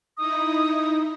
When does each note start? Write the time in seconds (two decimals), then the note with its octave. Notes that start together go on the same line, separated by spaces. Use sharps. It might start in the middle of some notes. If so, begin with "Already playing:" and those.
0.17 D#4 E4 D#6